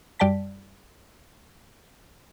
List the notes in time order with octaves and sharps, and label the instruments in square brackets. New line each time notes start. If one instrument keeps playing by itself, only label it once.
[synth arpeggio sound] F#2 G3 D5 G5 A5 B6